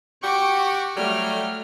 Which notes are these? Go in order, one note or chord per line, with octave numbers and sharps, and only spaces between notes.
F#4 G4 C#6 D6
F#3 G3 A3 F6